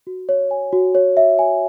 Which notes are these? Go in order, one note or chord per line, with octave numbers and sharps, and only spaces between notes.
F#4
C#5
G#5
F#4
C#5
E5
G#5